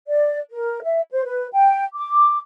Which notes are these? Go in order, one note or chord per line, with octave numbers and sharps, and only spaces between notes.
D5
A#4
E5
C5
B4
G5
D6